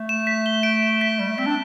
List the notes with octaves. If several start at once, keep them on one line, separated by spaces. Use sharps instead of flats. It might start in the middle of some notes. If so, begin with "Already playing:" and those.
Already playing: A3
E7
B6
G7
D7
E7
B6
G3 D7
A3
C4 B6
D4